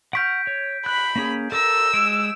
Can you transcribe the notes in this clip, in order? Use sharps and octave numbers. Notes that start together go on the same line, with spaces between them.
F#5 C#6 F6 G6 B6 D7
C#5
B5 F#6
A#3 C#4 G#4
A4 A#4 E6
G#3 D7 E7